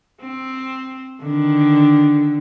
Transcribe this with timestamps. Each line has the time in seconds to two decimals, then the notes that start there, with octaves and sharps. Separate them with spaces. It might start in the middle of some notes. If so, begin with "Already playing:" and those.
0.22 C4
1.22 D3 D#3